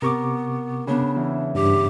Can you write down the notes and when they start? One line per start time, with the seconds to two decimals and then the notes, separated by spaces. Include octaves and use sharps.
0.02 C3 B3 A#4 C#6 D6
0.87 C#3 B3 D4
1.16 E2 E3
1.55 G2 G4